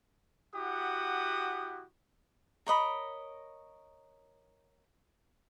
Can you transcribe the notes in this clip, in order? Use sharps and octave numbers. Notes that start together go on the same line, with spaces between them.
E4 F#4 G4 F#5 D#6
A#4 C#5 D#5 B5